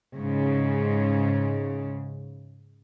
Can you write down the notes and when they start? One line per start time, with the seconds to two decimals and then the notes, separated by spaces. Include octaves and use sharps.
0.17 G#2 C#3